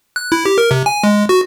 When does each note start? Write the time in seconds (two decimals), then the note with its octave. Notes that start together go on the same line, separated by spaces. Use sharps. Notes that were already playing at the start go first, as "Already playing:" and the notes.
0.16 F#6
0.32 E4
0.45 G4
0.58 A#4
0.71 C3
0.86 G#5
1.04 G#3
1.29 F#4